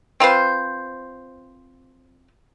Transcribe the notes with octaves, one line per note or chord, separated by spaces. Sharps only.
C4 F4 B4 C5